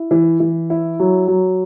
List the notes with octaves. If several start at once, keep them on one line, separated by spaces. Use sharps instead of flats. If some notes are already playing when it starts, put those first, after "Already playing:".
Already playing: E4
E3
E3
E4
F#3
F#3